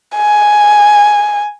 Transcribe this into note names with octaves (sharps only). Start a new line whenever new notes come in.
G#5